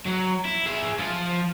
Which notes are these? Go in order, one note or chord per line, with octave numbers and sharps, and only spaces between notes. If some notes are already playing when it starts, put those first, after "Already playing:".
F#3
E4
G#4 E5
F3 F4